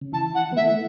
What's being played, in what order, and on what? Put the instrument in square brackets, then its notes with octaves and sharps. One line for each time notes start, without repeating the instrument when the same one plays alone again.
[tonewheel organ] C#3
[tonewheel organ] E3 [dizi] A5
[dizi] F#5
[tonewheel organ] B3
[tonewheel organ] E3 A3 [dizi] E5